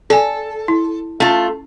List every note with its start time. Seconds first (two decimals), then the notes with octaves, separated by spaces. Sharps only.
0.10 A4 D5 G#5
0.68 E4
1.20 A3 C#4 F4